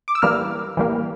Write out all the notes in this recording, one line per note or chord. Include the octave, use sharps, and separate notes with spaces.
D6
E6
E3 G3 A#3 F6
E3 G3 A#3